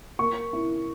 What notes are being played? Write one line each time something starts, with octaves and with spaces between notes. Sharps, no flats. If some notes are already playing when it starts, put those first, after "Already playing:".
A#3 C#6
E4